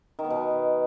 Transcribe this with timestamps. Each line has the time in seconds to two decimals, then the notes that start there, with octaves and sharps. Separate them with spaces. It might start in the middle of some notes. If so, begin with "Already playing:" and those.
0.19 D#3
0.25 B3
0.30 B2